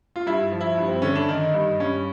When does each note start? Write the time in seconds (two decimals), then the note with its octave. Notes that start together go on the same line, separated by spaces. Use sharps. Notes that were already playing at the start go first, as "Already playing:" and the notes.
0.16 F4
0.27 G2 E4
0.52 F3
0.61 E4
0.78 G2
0.88 C4
1.02 D3 C#4
1.15 D4
1.29 D#3 D#4
1.54 G2
1.80 G2 C#4